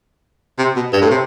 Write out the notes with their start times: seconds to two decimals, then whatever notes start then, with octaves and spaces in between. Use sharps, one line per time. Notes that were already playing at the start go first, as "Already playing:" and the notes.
0.59 C3
0.76 B2
0.93 G2
1.02 A2
1.11 C3